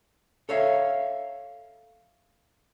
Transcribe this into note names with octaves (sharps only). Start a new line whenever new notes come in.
A4 C#5 E5 F5